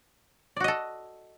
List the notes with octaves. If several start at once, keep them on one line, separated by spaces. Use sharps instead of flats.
F#4 A4 D5 D#5